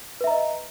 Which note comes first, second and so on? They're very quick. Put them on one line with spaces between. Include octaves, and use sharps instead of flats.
B4 E5 A#5 D#5